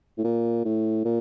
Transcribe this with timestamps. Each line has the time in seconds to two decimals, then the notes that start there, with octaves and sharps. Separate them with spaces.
0.18 A2
0.24 A#2
0.65 A2
1.05 A#2